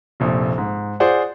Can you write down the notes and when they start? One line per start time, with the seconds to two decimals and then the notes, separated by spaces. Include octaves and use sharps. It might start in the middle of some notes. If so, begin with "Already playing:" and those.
0.20 F1 A#1
0.58 G#2
1.00 F4 G#4 C5 D5 F#5